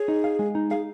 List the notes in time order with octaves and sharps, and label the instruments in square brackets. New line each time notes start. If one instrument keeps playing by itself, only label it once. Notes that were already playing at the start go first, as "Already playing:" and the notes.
Already playing: [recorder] G#4 [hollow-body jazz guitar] C#5
[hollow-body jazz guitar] D#4
F5
G#3
D#4
[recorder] G#4 [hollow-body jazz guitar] F5